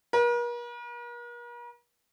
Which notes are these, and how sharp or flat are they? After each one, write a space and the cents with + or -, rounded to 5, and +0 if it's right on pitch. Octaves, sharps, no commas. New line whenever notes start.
A#4 +45